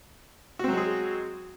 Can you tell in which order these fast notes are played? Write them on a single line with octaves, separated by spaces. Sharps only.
F#4 C4 F#3 G#3 G#4